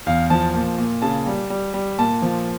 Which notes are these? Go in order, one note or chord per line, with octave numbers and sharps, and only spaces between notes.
E2 F5
F3 A5
A#2
A#2
C#3 A5
G3
G3
G3
A#2 A5
F3